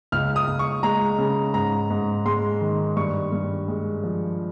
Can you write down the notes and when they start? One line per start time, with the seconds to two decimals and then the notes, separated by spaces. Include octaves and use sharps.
0.12 C#2 F6
0.36 D#6
0.48 C#2
0.59 C#6
0.83 G#3 A#5
1.18 C#3
1.54 G#2 A#5
1.90 G#2
2.26 G#3 C6
2.61 D#3
2.96 G2 C#6
3.32 G2
3.68 G#3
4.03 F3